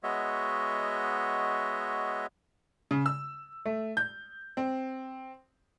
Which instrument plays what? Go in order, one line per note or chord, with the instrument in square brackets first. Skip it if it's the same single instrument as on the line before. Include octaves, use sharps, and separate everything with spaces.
[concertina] G#3 B3 F#4 C#5 D#5 E5
[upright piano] C#3
E6
A3
G6
C4